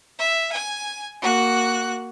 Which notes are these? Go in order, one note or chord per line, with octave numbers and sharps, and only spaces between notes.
E5
G#5
A#3 F#4 F#6